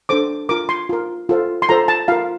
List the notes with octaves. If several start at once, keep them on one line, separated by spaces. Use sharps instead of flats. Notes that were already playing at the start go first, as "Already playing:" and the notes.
D4 A4 C5 D6
F4 A#4 D6
C6
F4 A#4
F4 A4 C5
C6
F4 A4 C5 A#5
A5
F4 A#4 F5